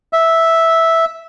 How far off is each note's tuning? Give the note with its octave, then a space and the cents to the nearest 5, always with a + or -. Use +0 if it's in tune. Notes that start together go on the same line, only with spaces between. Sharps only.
E5 -5